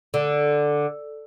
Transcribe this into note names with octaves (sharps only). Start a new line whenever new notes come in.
D3